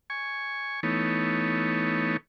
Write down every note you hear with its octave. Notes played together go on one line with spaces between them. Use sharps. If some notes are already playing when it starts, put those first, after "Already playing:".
G#5 C#6
E3 A3 B3 D#4 C#5